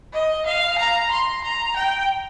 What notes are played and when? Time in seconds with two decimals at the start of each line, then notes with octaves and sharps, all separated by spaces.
0.13 D#5
0.46 F5
0.78 A#5
1.11 C6
1.43 A#5
1.76 G5